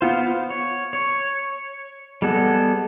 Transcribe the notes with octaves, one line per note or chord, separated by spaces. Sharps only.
B3 F4 C5
C#5
C#5
G3 G#3 B3 A4